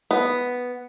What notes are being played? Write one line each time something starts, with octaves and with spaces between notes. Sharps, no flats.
B3